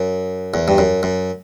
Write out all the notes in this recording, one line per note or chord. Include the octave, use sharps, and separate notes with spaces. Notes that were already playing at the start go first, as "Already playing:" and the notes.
Already playing: F#2
E2
G2
F#2
F#2